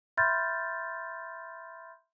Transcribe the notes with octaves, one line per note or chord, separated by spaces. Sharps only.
E5 B5 C6 F6 G6 A6